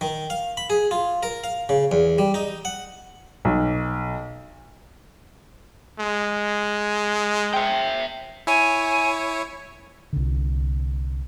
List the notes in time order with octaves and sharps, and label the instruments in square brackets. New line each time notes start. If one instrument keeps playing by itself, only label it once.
[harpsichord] D#3
F5
B5
G#4
F4
A#4
F5
C#3
E2
G3
D#4
F#5
[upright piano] B1
[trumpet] G#3
[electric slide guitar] E5 G5
[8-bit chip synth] E4 C#5 [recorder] G#5
[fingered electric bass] C2 D3